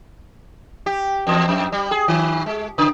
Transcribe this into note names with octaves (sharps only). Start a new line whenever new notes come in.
G4
E2
F2
G3
G#4
D#3
G#3
C#3